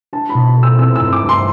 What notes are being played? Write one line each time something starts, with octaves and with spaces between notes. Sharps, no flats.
D4 A5
B5
B2
A4
E6
C4 E6
E6
G2
D6
G2
C6